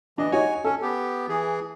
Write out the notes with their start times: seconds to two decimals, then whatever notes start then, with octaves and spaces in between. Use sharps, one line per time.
0.18 E3 D4 D#5
0.32 D#4 F#4 C#5 G#5
0.64 C#4 A4
0.82 B3 G4
1.29 E3 G#4